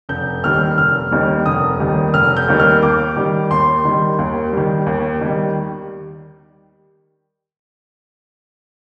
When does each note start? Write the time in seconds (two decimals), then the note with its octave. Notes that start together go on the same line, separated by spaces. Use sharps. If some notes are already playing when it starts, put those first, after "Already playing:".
0.09 F1 G6
0.43 D#2 D#3 G3 F6
0.78 F1 F6
1.11 D#2 D#3 G3
1.46 F1 D#6
1.80 D#2 D#3 G3
2.14 F1 F6
2.37 G6
2.48 D#2 D#3 G3
2.60 F6
2.82 D#2 D6
3.17 D#3 G3
3.51 D#2 C6
3.85 D#3 G3
4.19 D#2
4.53 D#3 G3
4.86 D#2
5.21 D#3 G3